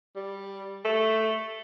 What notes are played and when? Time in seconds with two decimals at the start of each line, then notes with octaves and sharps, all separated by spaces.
0.16 G3
0.85 A3